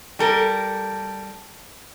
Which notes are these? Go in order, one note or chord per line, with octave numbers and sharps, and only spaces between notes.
G3 A4 A#4